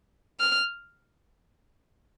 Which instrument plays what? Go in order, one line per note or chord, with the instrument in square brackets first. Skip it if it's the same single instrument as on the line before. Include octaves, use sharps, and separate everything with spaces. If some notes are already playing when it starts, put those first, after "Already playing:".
[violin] F6